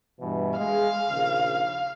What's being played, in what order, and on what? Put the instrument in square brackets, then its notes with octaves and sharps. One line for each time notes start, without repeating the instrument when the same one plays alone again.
[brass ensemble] G2 B2 E3
[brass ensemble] G#3 [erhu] F5
[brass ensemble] A#1 D#2 C#3